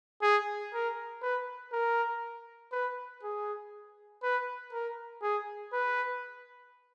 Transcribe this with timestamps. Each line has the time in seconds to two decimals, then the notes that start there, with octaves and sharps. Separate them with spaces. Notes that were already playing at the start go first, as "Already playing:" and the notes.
0.22 G#4
0.73 A#4
1.22 B4
1.73 A#4
2.72 B4
3.23 G#4
4.23 B4
4.73 A#4
5.22 G#4
5.73 B4